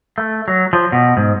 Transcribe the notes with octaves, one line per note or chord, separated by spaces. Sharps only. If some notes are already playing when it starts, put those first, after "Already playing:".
A3
F#3
F3
B2
G#2